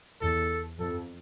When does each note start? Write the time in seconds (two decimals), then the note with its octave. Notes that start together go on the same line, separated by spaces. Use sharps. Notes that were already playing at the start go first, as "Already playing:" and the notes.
0.22 E2 A4
0.80 F2 A4